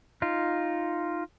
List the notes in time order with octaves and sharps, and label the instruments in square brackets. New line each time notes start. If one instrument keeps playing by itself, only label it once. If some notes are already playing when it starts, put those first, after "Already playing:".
[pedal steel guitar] D#4 F4